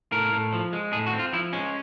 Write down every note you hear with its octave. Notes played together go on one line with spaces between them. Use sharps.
A2 A#4
A2
F3
G#3
A2 G#4
F#4
C4
F4
F3 E4
G#3 C#4